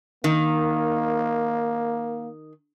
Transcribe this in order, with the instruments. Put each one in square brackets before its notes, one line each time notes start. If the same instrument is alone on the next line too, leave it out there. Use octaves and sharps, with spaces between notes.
[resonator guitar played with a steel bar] D#3 [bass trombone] A#3